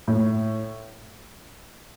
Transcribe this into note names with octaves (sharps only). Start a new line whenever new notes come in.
A2